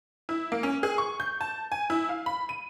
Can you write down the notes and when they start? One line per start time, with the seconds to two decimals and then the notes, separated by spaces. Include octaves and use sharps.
0.29 E4
0.52 A#3
0.63 C#4
0.83 G#4
0.98 C#6
1.20 G6
1.41 A5
1.72 G#5
1.90 E4
2.09 F5
2.26 B5
2.49 D#7